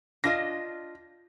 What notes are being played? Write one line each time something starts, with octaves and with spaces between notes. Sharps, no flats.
D4 F4 D#5 A#6